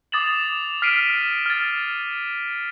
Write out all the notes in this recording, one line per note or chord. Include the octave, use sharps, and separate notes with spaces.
D6 D#6 A6 E7 F#7
F6 B6 C7 D7 D#7
F6 A6